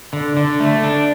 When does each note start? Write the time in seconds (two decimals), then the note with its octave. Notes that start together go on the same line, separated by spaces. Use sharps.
0.13 D3
0.37 D3
0.60 A3
0.83 D4